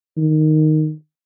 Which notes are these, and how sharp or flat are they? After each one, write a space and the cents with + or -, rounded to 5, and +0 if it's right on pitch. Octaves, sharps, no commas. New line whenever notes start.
D#3 -5